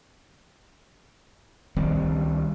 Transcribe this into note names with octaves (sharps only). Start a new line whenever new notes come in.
C#2 D#3 G3 C4